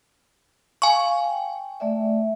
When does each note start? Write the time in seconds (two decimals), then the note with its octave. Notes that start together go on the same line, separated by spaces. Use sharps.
0.82 F5 G#5 C#6
1.25 G5
1.80 A3 D5 E5